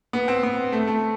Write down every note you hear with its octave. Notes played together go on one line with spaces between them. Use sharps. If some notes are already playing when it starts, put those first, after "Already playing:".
B3
C4
B3
A3
A3